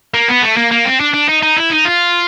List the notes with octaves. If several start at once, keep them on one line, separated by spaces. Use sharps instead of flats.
A#3
B3
A3
A#3
A#3
C4
D4
D4
D#4
D#4
E4
D#4
F4